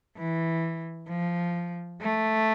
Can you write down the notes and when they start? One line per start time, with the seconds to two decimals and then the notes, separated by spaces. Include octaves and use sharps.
0.17 E3
1.08 F3
2.01 A3